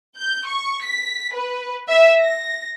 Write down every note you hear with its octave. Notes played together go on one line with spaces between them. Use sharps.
G6
C#6
B6
B4
E5
A#6